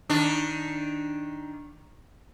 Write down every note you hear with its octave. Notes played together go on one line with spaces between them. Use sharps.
D#3 D4